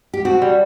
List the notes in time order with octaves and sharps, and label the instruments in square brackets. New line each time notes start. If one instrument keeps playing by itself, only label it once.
[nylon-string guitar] G4
[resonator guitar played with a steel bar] C4 [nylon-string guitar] F#4
[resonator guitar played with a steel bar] G3